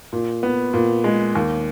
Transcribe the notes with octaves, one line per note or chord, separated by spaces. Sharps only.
A#2
B3
A#2
G#3
D#2